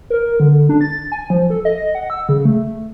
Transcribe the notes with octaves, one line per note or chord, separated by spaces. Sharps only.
A#4
D3
D4
A6
G#5
F3
A4
D#5
F#5
E6
C#3
A3